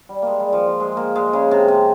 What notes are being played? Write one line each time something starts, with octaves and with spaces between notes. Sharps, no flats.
G3
G#3 A#3
G3
F3
F3
G#3
A#3
G#3
C#3
C3
C3